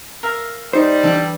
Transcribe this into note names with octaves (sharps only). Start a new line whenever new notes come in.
A#4 E5 F5
G3 D#4 C5
E3 D4 A4 D5 G5